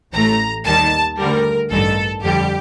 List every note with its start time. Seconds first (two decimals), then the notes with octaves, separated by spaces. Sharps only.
0.12 A1 A2 A3 A#5
0.65 D#2 D#3 G3 A5
1.18 D2 D3 G3 A#4
1.70 A1 G2 D#3 A4
2.22 F2 D3 G3 G4